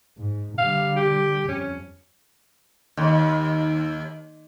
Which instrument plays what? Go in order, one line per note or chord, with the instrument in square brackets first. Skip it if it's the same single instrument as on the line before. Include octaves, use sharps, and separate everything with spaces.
[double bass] G#2
[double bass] D3 G3 [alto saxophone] F5
[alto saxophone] G4
[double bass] F2 [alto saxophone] C#4
[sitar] D#2